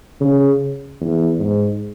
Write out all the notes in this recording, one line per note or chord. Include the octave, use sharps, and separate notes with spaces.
C#3
E2
G#2